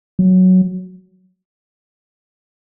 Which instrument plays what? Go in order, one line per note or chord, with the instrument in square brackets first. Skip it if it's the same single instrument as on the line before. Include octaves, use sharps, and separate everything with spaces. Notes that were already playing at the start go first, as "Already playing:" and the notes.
[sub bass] F#3